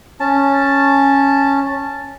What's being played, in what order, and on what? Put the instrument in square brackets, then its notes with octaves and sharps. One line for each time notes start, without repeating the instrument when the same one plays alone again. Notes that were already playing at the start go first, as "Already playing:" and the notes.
[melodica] C#4 A5